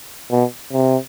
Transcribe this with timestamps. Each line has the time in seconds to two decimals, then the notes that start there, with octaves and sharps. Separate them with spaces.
0.31 B2
0.72 C3